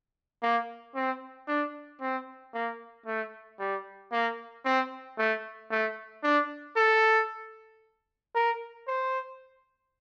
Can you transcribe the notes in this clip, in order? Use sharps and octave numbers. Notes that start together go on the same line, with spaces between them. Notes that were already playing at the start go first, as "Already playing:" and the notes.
A#3
C4
D4
C4
A#3
A3
G3
A#3
C4
A3
A3
D4
A4
A#4
C5